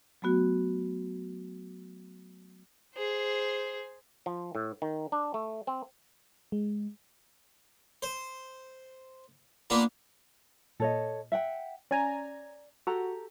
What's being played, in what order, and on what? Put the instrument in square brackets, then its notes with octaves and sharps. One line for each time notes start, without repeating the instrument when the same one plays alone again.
[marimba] F#3 A3 B3 F#4
[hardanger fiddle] G#4 C5
[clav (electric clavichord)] F3
A2
D#3
D4
A3
C4
[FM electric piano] G#3
[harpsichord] C5
A#3 B3 D4 F4
[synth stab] A#2 [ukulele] A4 C#5 D#5
[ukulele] E5 F#5 G5
[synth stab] C#4 G#5 A#5 [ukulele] D5
[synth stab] F#4 [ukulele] G4 A4 A#5